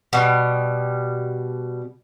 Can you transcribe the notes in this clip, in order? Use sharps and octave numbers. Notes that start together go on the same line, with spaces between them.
B2 G3